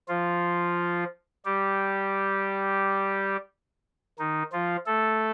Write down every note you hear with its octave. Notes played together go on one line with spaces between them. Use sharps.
F3 F4
G3 G4
D#3 D#4
F3 F4
A3 A4